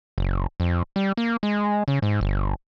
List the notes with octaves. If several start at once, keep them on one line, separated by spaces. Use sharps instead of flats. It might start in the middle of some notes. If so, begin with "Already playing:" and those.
F#1
F2
G3
A#3
G#3
C#3
G#2
G1